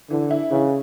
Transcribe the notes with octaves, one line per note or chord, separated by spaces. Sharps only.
D3 E3
E4
C#3 E3